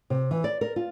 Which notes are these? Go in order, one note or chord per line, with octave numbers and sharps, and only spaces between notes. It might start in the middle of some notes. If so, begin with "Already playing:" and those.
C3
E3
D5
A#4
F4